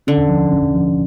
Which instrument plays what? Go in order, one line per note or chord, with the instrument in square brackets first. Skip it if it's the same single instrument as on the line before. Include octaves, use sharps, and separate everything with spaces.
[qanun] D3 [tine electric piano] C#4
[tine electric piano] F3
C#4
F3